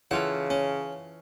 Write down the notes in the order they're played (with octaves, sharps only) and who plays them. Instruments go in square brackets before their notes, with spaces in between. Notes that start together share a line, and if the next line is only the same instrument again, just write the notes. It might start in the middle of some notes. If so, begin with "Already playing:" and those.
[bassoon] C#3 [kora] E3 F4 A4 [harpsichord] F#5
[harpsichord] C#4